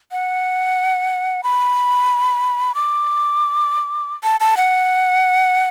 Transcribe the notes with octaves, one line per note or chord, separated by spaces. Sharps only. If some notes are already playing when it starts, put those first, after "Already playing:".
F#5
B5
D6
A5
A5
F#5